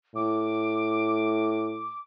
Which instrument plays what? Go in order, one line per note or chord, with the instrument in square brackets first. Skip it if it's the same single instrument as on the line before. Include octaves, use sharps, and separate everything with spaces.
[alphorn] A2 [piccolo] D6